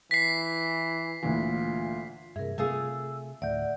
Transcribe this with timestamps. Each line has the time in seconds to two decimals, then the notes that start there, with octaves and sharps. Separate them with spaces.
0.11 E3 B6 C7
1.23 D2 A#2 E3 F4
2.36 G2 C3 G#4 A#4 E5
2.58 C3 A3 F4 G#4 E6
3.42 D2 A2 D5 E5 F#5 G6